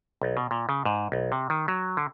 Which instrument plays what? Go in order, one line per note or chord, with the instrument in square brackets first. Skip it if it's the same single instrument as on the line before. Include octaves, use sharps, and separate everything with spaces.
[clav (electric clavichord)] B1
B2
A#2
C#3
G#2
B1
C3
D#3
F#3
D3